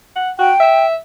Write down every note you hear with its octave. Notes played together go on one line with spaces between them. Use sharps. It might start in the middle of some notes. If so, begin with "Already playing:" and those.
F#5
F#4 G5
E5